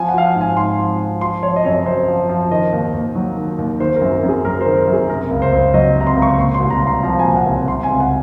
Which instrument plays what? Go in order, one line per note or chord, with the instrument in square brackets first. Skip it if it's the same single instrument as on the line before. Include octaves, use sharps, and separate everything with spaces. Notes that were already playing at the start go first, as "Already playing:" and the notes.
Already playing: [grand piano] F3 G#5
F#5
F3 F5
F#5
G#2
G#5
G#2 C6
F3
F3
F3 C6
F3 C#5
D#5
F#2 C#5
F#2 C5
F3
F3
D#3 D#5
D#2
D#2
F#3
D#3
D#2
D#3 C5
A#4
F#2
A#4
F#2
G#4
F#3 A#4
C5
D#3
A#4
F#2
G#4
C3 A#4
C#2
C5
C#2
F#3 D#5
C3
A#5
C6
C#2
C#6
A#2 C6
C6
C2
A#5
C2
C6
F3 A#5
G#5
A#2
F#5
C2
C3 C6
G#5
C#2
F#5